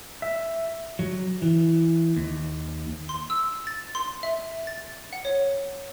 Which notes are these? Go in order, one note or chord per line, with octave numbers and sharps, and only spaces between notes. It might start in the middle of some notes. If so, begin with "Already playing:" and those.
E5
F#3
E3
D#2
C6
E6
A6
C6
E5
A6
F#5
C#5